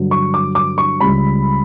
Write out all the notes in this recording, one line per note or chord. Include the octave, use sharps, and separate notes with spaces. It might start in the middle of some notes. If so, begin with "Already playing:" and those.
Already playing: G2 D3 F#3
C#6
D6
D6
C#6
C#2 C#3 G3 B5